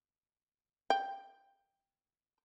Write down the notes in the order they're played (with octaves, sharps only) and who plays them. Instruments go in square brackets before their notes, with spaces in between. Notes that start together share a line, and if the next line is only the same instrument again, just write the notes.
[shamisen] G5